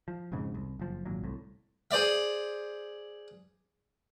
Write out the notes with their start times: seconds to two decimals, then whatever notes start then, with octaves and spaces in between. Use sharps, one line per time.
0.08 F3
0.32 E1 F2 G#2 C#3
0.54 C2
0.79 F#1 F3
1.05 G#1 A#2 F#3
1.24 C2 A2
1.91 G#4 C5 D5 E5